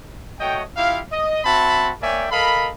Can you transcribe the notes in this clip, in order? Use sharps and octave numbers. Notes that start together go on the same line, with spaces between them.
A3 F#4 C#5 D#5 G5
E4 F4 G4 F5
D#5
C4 F#4 E5 A5 B5
A#3 C#5 D5 E5 G5 G#5
A4 A#4 D#5 F5 B5